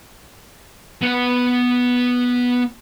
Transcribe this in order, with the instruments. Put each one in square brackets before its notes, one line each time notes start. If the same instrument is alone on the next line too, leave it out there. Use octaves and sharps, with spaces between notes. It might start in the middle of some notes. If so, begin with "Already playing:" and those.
[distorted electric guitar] B3 F#5